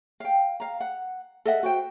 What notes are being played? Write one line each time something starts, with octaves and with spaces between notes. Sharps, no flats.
F5 G5
F5 A#5
F#5
A4 D#5 E5 F#5
F#4 C5 G5